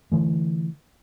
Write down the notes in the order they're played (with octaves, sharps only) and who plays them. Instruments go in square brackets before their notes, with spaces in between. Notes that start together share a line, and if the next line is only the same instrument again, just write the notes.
[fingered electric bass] D3 E3 A3